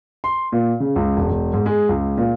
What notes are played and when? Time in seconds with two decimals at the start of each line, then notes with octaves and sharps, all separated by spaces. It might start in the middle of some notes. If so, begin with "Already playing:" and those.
0.24 C6
0.52 A#2
0.80 C#3
0.96 C#2
1.17 E1
1.30 E1
1.53 G#2
1.66 G#3
1.89 C#2
2.18 A#2